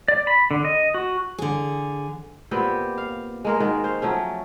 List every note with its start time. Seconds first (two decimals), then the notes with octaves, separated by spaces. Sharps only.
0.08 D5
0.27 B5
0.51 D3
0.65 D#5
0.94 F#4
1.38 D3 G#4
2.51 A#2 B3 C4 G4
2.98 F5
3.45 G#3 A#3 A#4
3.60 D#3 G#3 A#3 F#4
3.84 C5 F5
4.02 F3 F#3 A3 C#4